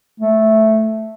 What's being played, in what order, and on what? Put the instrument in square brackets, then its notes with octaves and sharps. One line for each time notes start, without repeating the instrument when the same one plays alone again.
[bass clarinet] A3